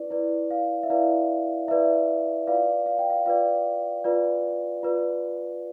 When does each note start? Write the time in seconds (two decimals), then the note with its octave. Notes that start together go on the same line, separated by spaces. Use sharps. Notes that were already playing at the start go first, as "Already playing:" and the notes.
Already playing: E4 B4 D5
0.10 E4 B4 D5
0.51 F5
0.83 E5
0.90 E4 B4 D5 F5
1.68 E4 B4 D5 E5
2.47 F4 B4 D5 F5
2.86 F5
2.99 G5
3.10 F5
3.26 F4 B4 D5 F5
4.04 F4 B4 D5
4.83 F4 B4 D5